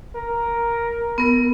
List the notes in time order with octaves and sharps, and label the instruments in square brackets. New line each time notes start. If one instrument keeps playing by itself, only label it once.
[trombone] A#4
[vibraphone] B3 A#4